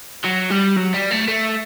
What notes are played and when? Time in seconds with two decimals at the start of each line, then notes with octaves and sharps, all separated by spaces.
0.25 F#3
0.51 G3
0.76 F#3
0.94 G3
1.11 A3
1.28 A3